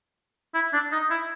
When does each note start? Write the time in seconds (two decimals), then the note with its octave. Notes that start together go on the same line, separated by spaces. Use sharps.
0.54 E4
0.73 D4
0.92 D#4
1.11 E4